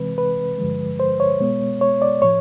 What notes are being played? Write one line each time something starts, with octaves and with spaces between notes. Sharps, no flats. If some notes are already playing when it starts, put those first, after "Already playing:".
Already playing: C3 E3 G#3 C4 B4
B4
G2 D3 F3 G#3
C5
C#5
B2 G#3 B3
C#5
D5
A2 F3 C#5